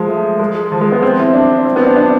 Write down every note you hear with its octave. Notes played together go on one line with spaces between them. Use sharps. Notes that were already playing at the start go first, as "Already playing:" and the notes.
Already playing: F3 G#3
A3
G#3
F3
G#3
B3
C4
E4
D4
C4
B3
C4
D4
D4